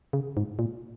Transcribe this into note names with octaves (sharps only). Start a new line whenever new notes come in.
C#3
G#2
A#2